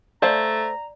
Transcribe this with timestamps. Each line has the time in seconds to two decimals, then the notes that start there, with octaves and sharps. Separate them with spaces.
0.22 A3 C5 D5 F5 A5 A#5